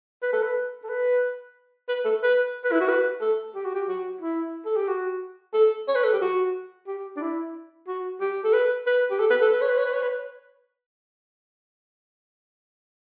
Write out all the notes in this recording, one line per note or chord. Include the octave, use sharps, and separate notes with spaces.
B4
A4
B4
A4
B4
B4
A4
B4
B4
E4
F#4
B4
A4
G4
F#4
G4
F#4
E4
A4
G4
F#4
A4
C#5
B4
A4
G4
F#4
G4
D4
E4
F#4
G4
A4
B4
B4
G4
A4
B4
A4
B4
C#5
B4
C#5
B4
C#5
B4